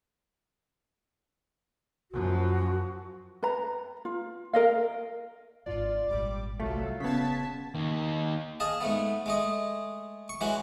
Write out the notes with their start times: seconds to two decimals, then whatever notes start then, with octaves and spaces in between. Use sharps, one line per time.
2.11 F#2 F3 F#4
3.43 B4 A#5
4.05 F4
4.53 A#4 D#5 F5
5.66 G#1 D4 F4 D5
6.06 G#1 A#2 G3 D6
6.60 C2 F#3 A3 F4 A4
7.00 D#1 C#3 B3 A5 G#6 B6
7.75 D#2
8.60 G#4 D#5 F5 A5
8.81 G#2 A3 B3
9.26 G#3 A3 D#5
10.29 C#6
10.41 E3 G#3 C#4 F#4